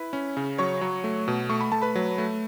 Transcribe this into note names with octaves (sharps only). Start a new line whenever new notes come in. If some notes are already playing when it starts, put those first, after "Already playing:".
Already playing: E4 B4 B5
C#4
C#3
F#3 C#5 C#6
F#3
A3
B2
A3 C#6
B5
A3 A5
B4 B5
F#3
A3